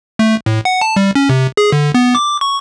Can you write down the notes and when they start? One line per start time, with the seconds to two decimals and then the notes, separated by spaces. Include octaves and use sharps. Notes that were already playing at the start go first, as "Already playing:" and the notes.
0.19 A3
0.46 A2
0.65 F#5
0.81 A5
0.96 G3
1.15 C#4
1.29 C3
1.57 G#4
1.72 D3
1.94 B3
2.15 D6
2.41 C#6